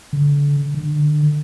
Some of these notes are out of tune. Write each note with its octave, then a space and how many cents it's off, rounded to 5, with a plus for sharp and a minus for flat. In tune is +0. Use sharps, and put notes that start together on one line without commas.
D3 -30
D3 +30